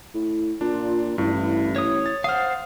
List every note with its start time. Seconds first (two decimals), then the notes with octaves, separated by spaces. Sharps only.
0.14 A2
0.61 A#2 D4 F4
1.18 A1 G2 E4
1.76 C#5 D#6
2.06 A6
2.24 C5 F5 F#5 D#6 F6